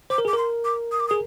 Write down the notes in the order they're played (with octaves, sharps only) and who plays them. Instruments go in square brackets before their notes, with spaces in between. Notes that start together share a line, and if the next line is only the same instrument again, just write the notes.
[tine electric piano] C5 [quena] D6
[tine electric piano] A#4
G#4
[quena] D6
[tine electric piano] A#4 [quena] C6
[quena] D6
D#6
D6
D#6
[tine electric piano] G#4